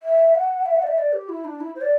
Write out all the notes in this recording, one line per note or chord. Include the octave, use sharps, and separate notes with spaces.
E5
F#5
E5
F#5
D5
E5
D5
G4
E4
D4
E4
C5
D5